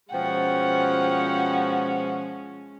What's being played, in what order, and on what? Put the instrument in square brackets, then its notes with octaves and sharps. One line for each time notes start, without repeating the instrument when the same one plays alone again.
[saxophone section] B2 F3 [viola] G#3 C#4 [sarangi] F#5 [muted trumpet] G5